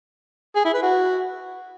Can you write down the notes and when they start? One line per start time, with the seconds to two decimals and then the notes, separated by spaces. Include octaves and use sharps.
0.56 G#4
0.65 E4
0.74 B4
0.83 F#4